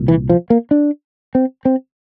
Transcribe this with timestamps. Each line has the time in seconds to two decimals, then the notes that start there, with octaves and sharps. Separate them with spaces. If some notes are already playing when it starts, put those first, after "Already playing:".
Already playing: C2 A#2
0.08 E3
0.29 F3
0.50 A#3
0.71 D4
1.35 C4
1.65 C4